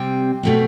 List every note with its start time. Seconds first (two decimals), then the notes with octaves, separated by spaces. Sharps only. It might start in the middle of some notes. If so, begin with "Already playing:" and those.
Already playing: C3 G3 C4 G5
0.43 B2 A3 C4